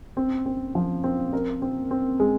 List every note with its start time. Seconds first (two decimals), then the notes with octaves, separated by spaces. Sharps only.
0.17 C4
0.46 C4
0.75 F3
1.04 C4
1.33 A#4
1.62 C4
1.91 C4
2.20 G#3